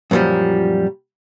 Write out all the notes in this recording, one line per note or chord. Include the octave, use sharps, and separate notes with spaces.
F#2 A#2 E3 F3 G3